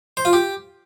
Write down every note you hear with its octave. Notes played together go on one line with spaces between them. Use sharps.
C5
F4
G4